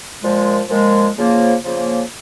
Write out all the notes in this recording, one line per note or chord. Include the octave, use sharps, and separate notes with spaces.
A#2 F3 G#3
A#2 F3 G#3
C#3 F3 A#3
C#3 F3 A#3